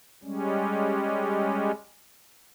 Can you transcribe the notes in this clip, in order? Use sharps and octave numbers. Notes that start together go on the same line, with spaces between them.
G3 G#3 C#4